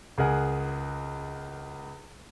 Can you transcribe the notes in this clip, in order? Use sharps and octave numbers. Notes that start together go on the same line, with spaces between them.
C#2 G#4 A#4 F#5 G#5